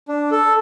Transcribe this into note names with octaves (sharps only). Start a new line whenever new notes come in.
D4
A4